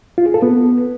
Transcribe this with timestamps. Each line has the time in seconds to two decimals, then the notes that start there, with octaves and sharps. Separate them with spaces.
0.18 F4
0.26 G#4
0.34 A4
0.42 B3